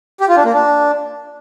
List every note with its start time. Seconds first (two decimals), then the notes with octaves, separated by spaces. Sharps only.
0.20 G4
0.29 F4
0.37 D4
0.45 A#3
0.53 D4